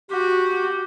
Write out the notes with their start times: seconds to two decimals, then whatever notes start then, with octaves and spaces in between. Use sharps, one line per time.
0.11 F#4 G4